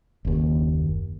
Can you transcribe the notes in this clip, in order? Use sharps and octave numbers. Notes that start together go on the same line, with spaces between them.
F#1 D#2